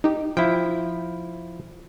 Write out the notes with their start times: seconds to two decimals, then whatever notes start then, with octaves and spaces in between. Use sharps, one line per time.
0.04 D#4 G4
0.37 F3 E4 G5